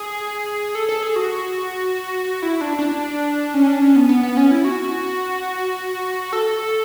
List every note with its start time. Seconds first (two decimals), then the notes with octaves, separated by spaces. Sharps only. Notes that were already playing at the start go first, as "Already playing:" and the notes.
Already playing: G#4
0.75 A4
0.89 A4
1.03 G#4
1.16 F#4
2.42 E4
2.61 D4
2.79 D4
3.54 C#4
3.67 D4
3.81 C#4
3.96 B3
4.09 B3
4.23 B3
4.37 C#4
4.51 E4
4.65 F#4
6.33 A4